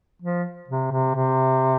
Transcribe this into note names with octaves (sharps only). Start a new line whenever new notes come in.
F3
C3
C3
C3